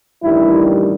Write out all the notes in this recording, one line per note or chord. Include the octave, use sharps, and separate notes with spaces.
A1 G2 D#3 G3 E4